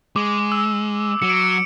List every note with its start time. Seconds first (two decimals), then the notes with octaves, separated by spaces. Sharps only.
0.16 G#3 D6
0.52 E6
1.22 F#3 C#7
1.30 D7
1.37 C#7